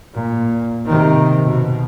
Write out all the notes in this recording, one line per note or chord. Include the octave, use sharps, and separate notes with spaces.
A#2
C3 D#3
B2